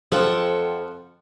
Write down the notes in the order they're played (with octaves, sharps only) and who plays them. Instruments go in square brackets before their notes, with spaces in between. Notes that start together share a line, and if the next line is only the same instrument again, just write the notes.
[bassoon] F2 [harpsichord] F3 [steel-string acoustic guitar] A4 F#5 G5